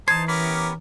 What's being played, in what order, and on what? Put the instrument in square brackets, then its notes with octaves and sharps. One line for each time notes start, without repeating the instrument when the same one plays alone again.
[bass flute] E3 [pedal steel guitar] D#4 C5 [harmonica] A5 [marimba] G#6
[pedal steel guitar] B3 G4 B5 [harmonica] C#4 A#4 D6